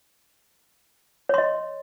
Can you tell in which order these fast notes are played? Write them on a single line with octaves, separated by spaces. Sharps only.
C#5 C6 D#5